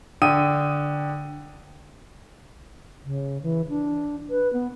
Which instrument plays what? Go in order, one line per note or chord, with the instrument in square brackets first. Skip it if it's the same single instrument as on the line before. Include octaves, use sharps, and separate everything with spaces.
[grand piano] D3 G5 D#6 D#7
[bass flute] C#3
E3
D4
B4
B3